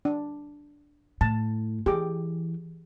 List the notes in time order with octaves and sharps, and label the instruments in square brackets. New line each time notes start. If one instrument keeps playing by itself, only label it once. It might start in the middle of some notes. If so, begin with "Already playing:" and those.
[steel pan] D4
[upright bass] A2 [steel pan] A5
[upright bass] E3 [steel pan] G4 G#4 D6